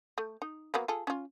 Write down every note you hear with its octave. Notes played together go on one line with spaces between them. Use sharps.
A3
D#4
F#3 A#3 B3
F4 G#4 A4
C#4 F4